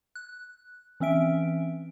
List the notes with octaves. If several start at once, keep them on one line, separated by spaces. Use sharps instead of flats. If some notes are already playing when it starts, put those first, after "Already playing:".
F#6
E3 C4 C#4 E5 D7